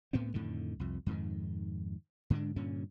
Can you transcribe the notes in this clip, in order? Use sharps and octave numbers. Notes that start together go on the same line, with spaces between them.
D2 A2 B3 C4
F2 A2 D3 D#3
C2 F2
F2 G#2 D#3
G#2 D3 G#3 D4
G2 A#2 D3 C#4